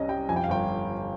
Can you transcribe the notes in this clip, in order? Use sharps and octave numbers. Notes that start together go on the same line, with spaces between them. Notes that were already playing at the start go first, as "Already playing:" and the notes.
Already playing: C2 C3 C#4 D#5
G3 G5
F2 G#5
G5
F5
G1 G5